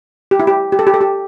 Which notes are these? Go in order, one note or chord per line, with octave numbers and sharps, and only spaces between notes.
G4
E4
G4
G4
A4
G4
A4
G4